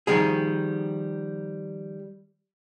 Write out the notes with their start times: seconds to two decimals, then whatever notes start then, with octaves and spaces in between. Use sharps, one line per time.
0.07 D#3 F3 G3 G#4